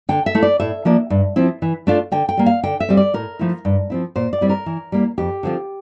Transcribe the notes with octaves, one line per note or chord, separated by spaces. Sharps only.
D3 G5
E5
A3 E4
D5
A2 E5
F3 A#3 D4
G2
F3 C4 E4
E3
A3 D4 F4
D3 G5
G5
G3 A#3
F5
D3 G5
E5
G3 C4
D5
A2 A#4
F3 A3 E4
G2
F3 C4 E4
A#2 C5
D5
G3 C4 E4
A#4
E3
G3 A#3 E4
F2 G4
D3 F3 C4 F4